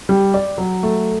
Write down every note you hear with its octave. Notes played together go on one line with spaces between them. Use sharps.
G3
D5
F#3
A3